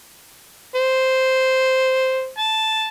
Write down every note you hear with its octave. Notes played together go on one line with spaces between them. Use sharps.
C5
A5